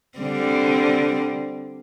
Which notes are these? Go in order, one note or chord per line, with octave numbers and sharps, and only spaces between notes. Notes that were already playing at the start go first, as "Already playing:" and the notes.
D3 G3 C4